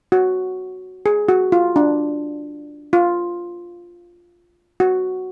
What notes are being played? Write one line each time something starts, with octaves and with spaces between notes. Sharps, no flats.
F#4
G#4
F#4
F4
D4
F4
F#4